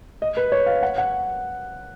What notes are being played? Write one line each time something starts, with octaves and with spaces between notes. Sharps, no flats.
D#5
B4
C#5
F5
F#5
F#5